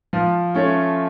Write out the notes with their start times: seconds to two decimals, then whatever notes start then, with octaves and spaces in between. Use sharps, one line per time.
0.13 F3
0.54 A3 C#4